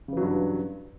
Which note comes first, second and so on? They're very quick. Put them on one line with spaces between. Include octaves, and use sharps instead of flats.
C#3 E3 F#3 G2